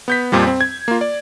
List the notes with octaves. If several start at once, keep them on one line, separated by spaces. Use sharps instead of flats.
B3 G6 B6
F2 A#2 F3 G3
C4
G#6
A#3 F4
D5